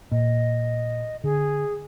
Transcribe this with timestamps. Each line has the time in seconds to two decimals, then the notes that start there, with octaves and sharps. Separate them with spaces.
0.12 A#2 D#5
1.24 D3 G#4